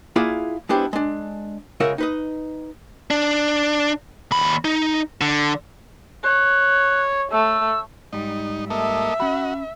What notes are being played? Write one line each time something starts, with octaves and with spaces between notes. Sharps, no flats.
A#3 E4 F4 G#4 D5 F#5
G#3 B3 D4 E4 G4 C5
G#3 D4
C#3 G#3 F4 A#4 E5 F#5
D#4 B4 D#5
D4
D#2 B5
D#4
D3
C#5 F#6
A3 E6
G#2 G3 D#4
A#3 A4 D#5 E5
C#4 F#4 B5